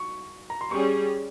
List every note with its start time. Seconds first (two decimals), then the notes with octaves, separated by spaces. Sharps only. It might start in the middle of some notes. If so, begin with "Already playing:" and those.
Already playing: C#6
0.50 A#5
0.61 C6
0.71 G3 C#4 G#4 C#6